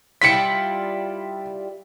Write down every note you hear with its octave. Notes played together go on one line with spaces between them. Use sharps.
G3 E4 F4 B6 C#7